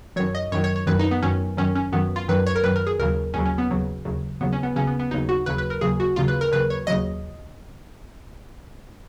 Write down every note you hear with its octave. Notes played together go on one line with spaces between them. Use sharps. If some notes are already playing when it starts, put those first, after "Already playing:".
F#2 D#3 F#3 C#5
D#5
F#2 D#3 F#3 C#5
C#5
C#5
F#2 D#3 F#3 B4
D#4
B3
F#2 D#3 F#3 C#4
F#2 D#3 F#3 C#4
C#4
F#2 D#3 F#3 B3
F4
F#2 D#3 F#3 B4
C#5
A#4
F#2 D#3 F#3 B4
A#4
G#4
D#2 C#3 F#3 A#4
D#2 C#3 F#3 C#4
C#4
B3
D#2 C#3 F#3
D#2 C#3 F#3
D#2 C#3 F#3 B3
C#4
B3
D#2 C#3 F#3 C#4
B3
B3
D#2 C#3 F#3 D#4
F#4
D#2 C#3 F#3 B4
B4
A#4
D#2 C#3 F#3 G#4
F#4
D#2 C#3 F#3 F4
B4
A#4
D#2 C#3 F#3 B4
C#5
D#2 C#3 F#3 D#5